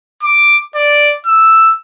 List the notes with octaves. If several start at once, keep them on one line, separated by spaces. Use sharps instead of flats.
D6
D5
E6